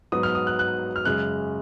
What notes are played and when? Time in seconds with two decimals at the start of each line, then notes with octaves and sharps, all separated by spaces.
0.12 G#2 F#3 B3 D#6
0.23 F6
0.35 D#6
0.47 F#6
0.59 F#6
0.96 F6
1.05 F#2 C#3 G#3 F#6